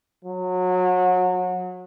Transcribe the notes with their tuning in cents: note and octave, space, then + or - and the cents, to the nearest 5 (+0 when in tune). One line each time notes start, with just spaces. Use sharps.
F#3 -25